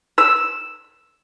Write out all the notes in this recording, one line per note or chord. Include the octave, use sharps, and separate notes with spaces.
E6